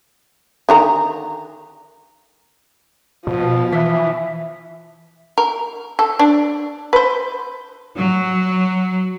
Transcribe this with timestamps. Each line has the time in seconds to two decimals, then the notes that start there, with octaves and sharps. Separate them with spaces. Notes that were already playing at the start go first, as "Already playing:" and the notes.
0.69 D3 D#3 A#5
3.27 B2 F3
3.72 E3 E5
5.38 A#4
5.99 A4
6.19 D4
6.93 B4 C5
7.95 F#3